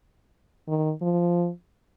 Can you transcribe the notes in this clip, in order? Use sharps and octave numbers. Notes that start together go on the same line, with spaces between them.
D#3
F3